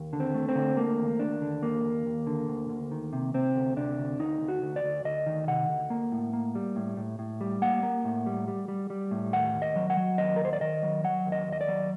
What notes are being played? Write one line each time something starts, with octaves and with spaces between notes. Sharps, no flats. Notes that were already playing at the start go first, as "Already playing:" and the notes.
Already playing: D#2
D3
C4
A3
C4
D3
A3 A#3
D#2
D#2 D4
D3
D#2 A#3
D#2
D#2
D3
D2
D2
D#3
C3
C3 C4
D2
C3 D4
D2
D2 D#4
D2
F#4
D2
D5
D2
D2 D#5
D#3
C3 F#5
D2
A#3
A2
A#3
G3
A2
A2
A2
G3
A#3 F#5
A#3
A2
G3
G3
G3
G3
A2
D#2 F#5
D#2
D#5
F#3
F#5
F#3
D#2 D#5
A#4
D#2 C5
D5
D#3 D#5
F#3
F#3 F#5
D#2
D#5
D#2
D#5
D5
F#3